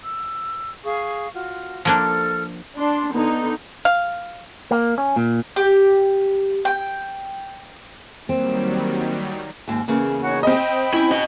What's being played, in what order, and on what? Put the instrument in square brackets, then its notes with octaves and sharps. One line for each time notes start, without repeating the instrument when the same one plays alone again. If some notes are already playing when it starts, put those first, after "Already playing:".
[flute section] E6
G#4 F5 C#6
F4 F#4
[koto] F3 A#3 D4 [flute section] A4 A5 F6
[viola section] D4 C6
D3 B3 D#4
[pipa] F5
[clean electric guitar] A#3
C#4
A#2
[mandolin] G4
G5
[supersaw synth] D#3 F#3 G3 [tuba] A#3 [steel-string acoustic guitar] C4
[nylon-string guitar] D#2 G#2 C4
E2 C#3 A#3
[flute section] D#4 F#4 C#5
[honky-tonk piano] C4 D#5 [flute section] G5 B5
[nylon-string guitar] C#4 [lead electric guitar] E4
[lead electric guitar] F#4 D#5